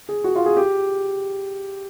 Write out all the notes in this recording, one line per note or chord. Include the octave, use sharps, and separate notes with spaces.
G#4
F#4
F4
G#4
G4